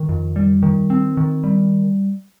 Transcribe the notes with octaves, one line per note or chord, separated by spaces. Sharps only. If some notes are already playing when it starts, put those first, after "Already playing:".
Already playing: D#3
F2
G3
D#3
C4
D#3
G3